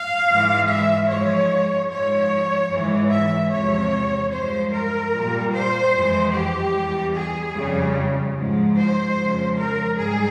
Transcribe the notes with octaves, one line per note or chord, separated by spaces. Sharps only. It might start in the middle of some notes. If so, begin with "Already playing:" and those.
Already playing: F5
G#2 E3 G#3
E5
G#2 F3 G#3 C#5
G#2 F3 G#3 C#5
G#2 E3 G#3
E5
E2 C3 F3 G#3 C#5
G2 F3 G#3 C5
A#4
A#2 G3
C5
F2 E3 G#3
G4
E2 E3 G3
G#4
F2 C#3 G3
G#2 F3 G#3
C5
F2 C#3 F3 G#3
A#4
G#2 G3 G#4